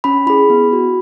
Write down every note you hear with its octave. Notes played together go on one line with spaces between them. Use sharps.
C#4 B5
E4 G#4 B5
B3
F#4